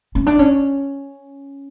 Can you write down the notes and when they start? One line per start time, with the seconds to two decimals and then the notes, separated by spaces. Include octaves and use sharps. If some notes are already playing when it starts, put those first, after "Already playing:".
0.15 C#4
0.27 D4
0.39 C#4